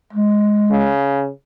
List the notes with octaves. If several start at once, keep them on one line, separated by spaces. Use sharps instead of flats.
G#3
C#3